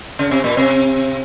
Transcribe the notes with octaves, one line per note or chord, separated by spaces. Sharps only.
C#3
C3
A#2
C3